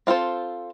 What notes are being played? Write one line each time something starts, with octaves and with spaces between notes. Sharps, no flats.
C4 F4 A4 C5